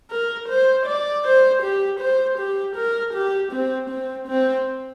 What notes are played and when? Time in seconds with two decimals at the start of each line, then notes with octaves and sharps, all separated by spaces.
0.11 A#4
0.49 C5
0.86 D5
1.25 C5
1.62 G4
2.00 C5
2.38 G4
2.76 A#4
3.14 G4
3.52 C4
3.90 C4
4.27 C4